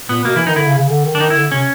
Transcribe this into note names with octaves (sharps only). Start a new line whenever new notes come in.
A#2 B3
B2 A#3
E3 E4
D#3 D#4
D3 E4
C#3
C#3
D3
D#3
D4
D#3 D#4
E4
D3
C3 C#4